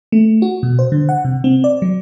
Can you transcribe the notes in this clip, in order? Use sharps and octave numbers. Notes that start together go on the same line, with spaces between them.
A3
F#4
B2
C5
D3
F#5
C3
C4
D5
F#3